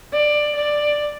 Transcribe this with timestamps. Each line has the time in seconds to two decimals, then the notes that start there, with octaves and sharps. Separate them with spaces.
0.13 D5
0.56 D5